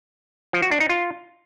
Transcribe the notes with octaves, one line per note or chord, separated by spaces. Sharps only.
F3
F#4
D4
D#4
F4